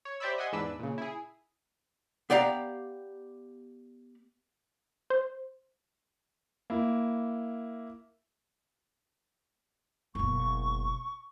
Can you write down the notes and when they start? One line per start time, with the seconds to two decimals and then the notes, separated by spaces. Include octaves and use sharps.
0.05 C#5
0.20 G4 C5 D5 E5 B5 E6
0.38 D#5 E5 F#5 G#5 C6
0.52 E2 G#2 D4 B4 E6
0.80 A#2 C#3
0.98 E4 G#4
2.30 B3 G4 D5 F5 A#5
5.10 C5
6.70 A#3 E4
10.15 F#1 B2 C#6